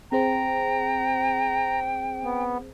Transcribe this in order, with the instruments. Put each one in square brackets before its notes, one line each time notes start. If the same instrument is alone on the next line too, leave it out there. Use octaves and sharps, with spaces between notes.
[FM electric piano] C4 G#4 C5 [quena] G5 [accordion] A#5
[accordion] B3